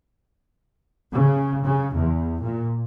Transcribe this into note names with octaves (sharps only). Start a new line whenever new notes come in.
C#3
C#3
E2
A#2